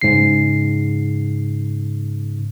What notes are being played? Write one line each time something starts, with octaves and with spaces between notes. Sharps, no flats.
G#2 C#3 C7